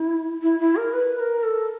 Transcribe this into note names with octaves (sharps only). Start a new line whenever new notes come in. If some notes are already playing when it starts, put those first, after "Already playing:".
Already playing: E4
E4
E4
A#4
B4
A#4
A4